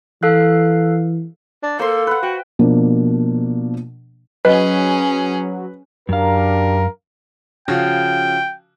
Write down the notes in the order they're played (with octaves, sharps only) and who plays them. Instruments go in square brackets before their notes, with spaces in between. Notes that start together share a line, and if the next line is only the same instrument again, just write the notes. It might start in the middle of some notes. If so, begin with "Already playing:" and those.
[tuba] E3 [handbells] A4 F5 F#6
[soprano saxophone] D4
[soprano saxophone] A#3 [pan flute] A4 [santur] C5 F5 C6
[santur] B4 F#5
[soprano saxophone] F#4 [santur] G5
[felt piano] B2 F3 A#3 D4
[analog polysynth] F#3 [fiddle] C#4 G#4 [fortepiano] B4 [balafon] D#5
[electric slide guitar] F#2 F5 [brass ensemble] D4 G4 A#4
[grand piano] C#3 F3 F#4 [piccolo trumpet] G5